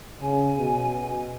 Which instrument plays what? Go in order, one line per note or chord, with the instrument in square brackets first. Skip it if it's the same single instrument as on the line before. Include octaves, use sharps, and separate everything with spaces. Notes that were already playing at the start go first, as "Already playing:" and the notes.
[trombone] C#3 [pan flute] G#5
[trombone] B2